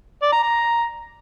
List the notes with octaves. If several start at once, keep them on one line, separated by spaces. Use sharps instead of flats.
D5
A#5
A#5